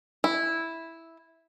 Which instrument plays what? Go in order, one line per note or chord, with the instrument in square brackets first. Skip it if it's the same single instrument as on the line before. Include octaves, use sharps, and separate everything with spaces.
[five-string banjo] E4